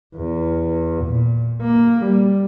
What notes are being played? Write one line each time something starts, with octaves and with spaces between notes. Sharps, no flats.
E2
A#2
A#3
G3